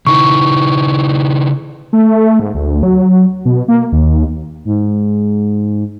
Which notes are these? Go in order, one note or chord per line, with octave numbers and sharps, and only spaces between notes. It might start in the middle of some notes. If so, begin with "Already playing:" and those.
C#3 D#4 E4 C#6
A3
G#2
D2
F#3
B2
A#3
D#2
G#2